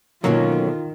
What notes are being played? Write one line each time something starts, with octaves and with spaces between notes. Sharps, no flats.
B2 D3 D#3 F#3 A#3 C#4 F4